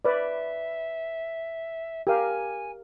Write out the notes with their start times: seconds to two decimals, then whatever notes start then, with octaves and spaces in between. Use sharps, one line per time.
0.05 B4 D5 E5
2.07 G4 A#4 F5 G#5